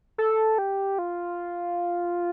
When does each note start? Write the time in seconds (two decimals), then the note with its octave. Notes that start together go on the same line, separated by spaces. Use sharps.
0.18 A4
0.58 G4
0.99 F4